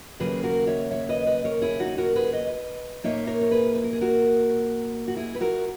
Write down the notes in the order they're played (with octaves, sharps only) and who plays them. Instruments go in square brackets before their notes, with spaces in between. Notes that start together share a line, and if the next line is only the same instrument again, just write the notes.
[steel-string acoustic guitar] D#2 C#3 F#3 A#3 G#4 B4
F#4 A#4
C#5 E5
C#5 E5
B4 D#5
B4 D#5
A#4 C#5
E4 G#4
D#4 F#4
F#4 A#4
G#4 B4
B4 D#5
A#2 A#3 D#4 C#5 E5
A#4 C#5
C#5
G#4 B4
B4
A#4
G#4
F#4 A#4
F#4
E4 G#4
B4
F#4 A#4